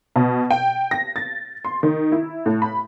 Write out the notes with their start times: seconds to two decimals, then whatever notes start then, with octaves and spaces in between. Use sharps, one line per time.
0.16 B2
0.51 G5
0.91 A#6
1.16 A6
1.65 C6
1.83 D#3
2.12 E4
2.46 A2
2.62 B5